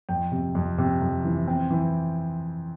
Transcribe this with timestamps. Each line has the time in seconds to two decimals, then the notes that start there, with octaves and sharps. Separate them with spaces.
0.09 F2 G5
0.32 C3
0.55 F2
0.78 C3
1.02 F2
1.25 E3
1.48 C4
1.71 E3